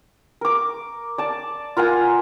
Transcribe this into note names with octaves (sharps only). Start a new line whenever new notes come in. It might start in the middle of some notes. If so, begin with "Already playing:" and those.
A#4 D6
D5 A5
F4 A#4 F#5 G#5